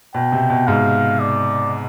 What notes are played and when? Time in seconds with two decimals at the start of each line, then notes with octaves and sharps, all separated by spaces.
0.14 B2 G5
0.32 C3
0.50 B2
0.67 G#2 F5
1.20 D5